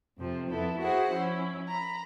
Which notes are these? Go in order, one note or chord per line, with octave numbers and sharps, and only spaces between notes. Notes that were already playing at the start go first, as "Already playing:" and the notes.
F2 C3 F3 C4
F2 B3 E4 A4
E4 F#4 G#4 C5 F#5
F3 C#4 E4
A#5 B5